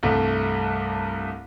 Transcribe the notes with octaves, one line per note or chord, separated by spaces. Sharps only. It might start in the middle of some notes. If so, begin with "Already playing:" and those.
C2 G2 A3